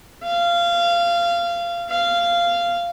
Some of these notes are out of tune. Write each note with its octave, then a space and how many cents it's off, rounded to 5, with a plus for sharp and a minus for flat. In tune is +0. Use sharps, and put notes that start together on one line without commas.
F5 -20
F5 -15